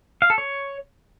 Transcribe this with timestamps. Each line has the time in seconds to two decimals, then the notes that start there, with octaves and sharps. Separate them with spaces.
0.22 F5
0.30 A4
0.38 C#5